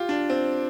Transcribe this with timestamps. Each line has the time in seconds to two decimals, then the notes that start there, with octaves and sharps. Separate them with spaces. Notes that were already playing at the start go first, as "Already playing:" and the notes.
Already playing: F4 G4
0.09 D4
0.30 C4